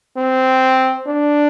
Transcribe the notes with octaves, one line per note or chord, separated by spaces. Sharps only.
C4
D4